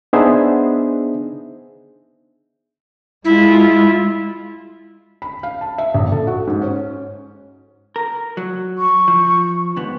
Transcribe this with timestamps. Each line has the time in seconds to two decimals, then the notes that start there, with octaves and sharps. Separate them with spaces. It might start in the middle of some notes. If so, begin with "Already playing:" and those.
0.13 B3 D4 D#4 G#4 C5 E5
3.25 G#3 E4 F4
5.22 B5
5.43 F5
5.61 A5
5.78 E5
5.95 A#1
6.12 A4
6.27 F#4
6.47 G#2
6.62 C#4
7.96 A#4
8.37 F#3
8.78 C#6
9.08 F3
9.76 D#2 G#2 B3